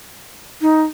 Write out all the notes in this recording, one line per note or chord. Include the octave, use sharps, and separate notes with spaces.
D#4